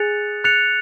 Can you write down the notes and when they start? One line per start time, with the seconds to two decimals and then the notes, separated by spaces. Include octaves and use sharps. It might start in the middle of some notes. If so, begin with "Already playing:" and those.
Already playing: G#4 F#6 A6 C#7 F7
0.44 F#6 A6 C#7 F7